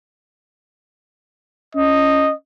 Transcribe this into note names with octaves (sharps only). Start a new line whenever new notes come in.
C#4 D#5